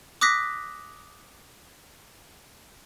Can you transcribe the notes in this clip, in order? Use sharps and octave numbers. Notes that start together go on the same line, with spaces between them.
D6 D#6 F#6 A#6 B6